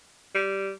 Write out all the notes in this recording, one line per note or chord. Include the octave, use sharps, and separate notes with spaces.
G3